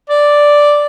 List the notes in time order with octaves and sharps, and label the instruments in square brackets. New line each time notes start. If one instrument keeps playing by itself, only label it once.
[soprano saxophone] D5